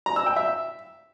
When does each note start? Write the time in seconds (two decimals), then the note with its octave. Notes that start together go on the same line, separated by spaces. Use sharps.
0.06 A#5
0.16 E6
0.26 G5
0.36 E5